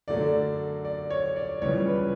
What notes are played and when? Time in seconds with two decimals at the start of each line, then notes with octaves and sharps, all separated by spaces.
0.08 F#2 D3 F#3 A3 D5
0.85 D5
1.10 C#5
1.36 D5
1.62 C#2 C#3 E3 G3 B3 C#5
1.88 B4